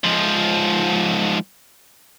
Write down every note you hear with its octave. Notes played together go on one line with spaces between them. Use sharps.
G#2 F3